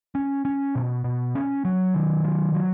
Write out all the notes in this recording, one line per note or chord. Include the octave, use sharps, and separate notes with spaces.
C#4
C#4
B2
B2
C#4
F#3
D#3
F#3
F#3